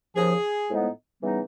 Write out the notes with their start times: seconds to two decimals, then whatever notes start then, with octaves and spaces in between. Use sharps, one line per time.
0.15 D#2 C#3 F3 G#4
0.68 A2 F3 G#3 B3 D#4
1.21 C#3 E3 G3 B3 D#4